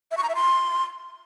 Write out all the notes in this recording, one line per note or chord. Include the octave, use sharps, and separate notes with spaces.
E5
C#6
A#5
E5
C6